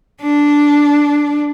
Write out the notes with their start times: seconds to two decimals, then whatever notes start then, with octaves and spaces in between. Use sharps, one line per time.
0.22 D4